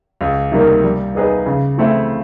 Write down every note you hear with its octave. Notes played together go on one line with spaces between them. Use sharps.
C#2
C3 D#3 G3 A#3
G3
B3 D#4 G#4 B4
C#3
E3 A3 C4 E4